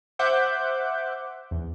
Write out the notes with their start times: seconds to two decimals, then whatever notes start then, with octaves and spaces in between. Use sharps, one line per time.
0.19 C5 E5 F#5 D6 F#6 G6
1.51 E2